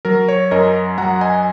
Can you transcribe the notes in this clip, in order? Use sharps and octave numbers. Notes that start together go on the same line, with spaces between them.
F#3 A#4
C#5
F#2 A#4 D#5
F#3 F#5 A#5
D#5 G#5